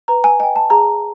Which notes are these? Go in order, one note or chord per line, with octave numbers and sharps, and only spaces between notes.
B4 A#5
G#5
D#5 G5 G#5
A5
G#4 A#5